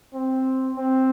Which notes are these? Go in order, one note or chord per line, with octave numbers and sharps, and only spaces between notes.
C4
C4